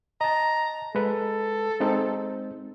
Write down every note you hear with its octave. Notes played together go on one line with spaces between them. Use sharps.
D#5 A5 A#5
G#3 A4 B4
G#3 C4 D#4